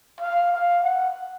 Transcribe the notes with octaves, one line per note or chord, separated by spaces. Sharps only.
F5
F5
F#5